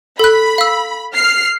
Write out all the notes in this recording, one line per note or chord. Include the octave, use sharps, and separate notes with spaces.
A4 B5 F#6
F5 E6
F6 C7